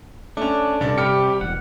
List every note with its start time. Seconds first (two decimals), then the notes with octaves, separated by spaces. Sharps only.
0.37 A3 C#4 D4
0.81 G2 C3 A4 D5
0.97 G3 G4 F6 C#7
1.41 E1 F#5